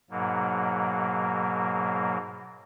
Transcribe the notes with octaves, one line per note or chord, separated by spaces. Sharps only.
G#2 B2 F#3 A#3